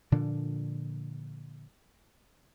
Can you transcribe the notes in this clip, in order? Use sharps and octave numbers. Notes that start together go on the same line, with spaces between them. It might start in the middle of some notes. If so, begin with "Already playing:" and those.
A#2 D3 F3 D4